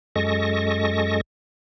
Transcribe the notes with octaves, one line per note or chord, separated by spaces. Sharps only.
F#2 G#3 A4 D#5 C#6 A#6